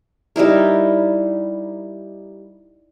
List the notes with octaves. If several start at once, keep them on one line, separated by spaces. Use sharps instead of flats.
G3 D#4 E4 A#4